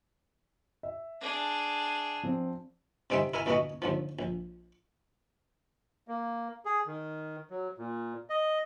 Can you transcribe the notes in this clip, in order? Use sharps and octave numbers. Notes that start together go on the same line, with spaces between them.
E5
D4 G#4
F3 C4
C3 G3 C4 D#4 G#4 E5
E4 A#4 E5 G#5 A#5
D2 E3 A#3 B3 F#4 D#5
D#2 D3 F3
A#1
A#3
G#4
D#3
F#3
A#2
D#5